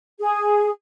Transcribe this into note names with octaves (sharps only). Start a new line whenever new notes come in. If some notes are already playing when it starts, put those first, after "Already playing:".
G#4